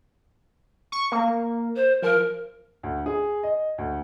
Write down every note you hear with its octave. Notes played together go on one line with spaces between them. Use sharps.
C#6
A#3
C5
F3 A#4
D2
G#4
D#5
D2